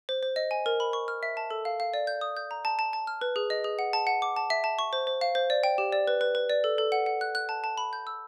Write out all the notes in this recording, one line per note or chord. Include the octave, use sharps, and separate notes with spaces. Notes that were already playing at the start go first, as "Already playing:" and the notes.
C5
C5
D#5
G#5
A#4
B5
C#6
F6
E5
A5
A4
F5
F5
D5
G6
D#6
G6
A#5
A5
A5
A5
F6
B4
G#4
D#5
G#4
F#5
A5
F#5
D6
A5
E5
A5
C#6
C5
C5
F5
C5
D5
G5
G4
D5
B4
B4
B4
D5
A4
A4
F#5
F#5
F#6
F#6
A5
A5
B5
G6
E6